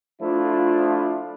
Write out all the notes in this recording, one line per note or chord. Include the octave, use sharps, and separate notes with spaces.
F3 A3 D4 E4 F4